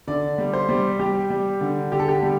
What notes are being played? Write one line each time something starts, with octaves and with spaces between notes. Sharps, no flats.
D3 D5
G3
C5
G3
G3 G4
G3
D3
D3 G4
A4
G4
G3